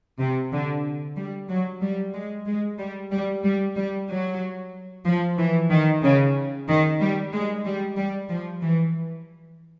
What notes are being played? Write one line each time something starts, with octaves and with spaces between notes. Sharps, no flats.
C3
D3
G3
F#3
G3
G#3
G#3
G3
G3
G3
G3
F#3
F3
E3
D#3
C#3
D#3
G3
G#3
G3
G3
F3
E3